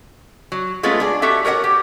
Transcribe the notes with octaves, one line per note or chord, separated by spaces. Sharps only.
F#3
G#3 A3 B3 C#4 F4
D4 G#4
F#4 G4 A4 E5
F#4 A#4 C#5 D#5 F#5
G4